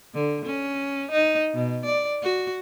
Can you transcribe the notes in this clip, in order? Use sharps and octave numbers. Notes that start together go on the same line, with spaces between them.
D3
C#4
D#4
B2
D5
F#4